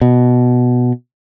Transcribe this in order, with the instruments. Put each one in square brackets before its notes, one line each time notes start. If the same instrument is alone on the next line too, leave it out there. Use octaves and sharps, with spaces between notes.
[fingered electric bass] B2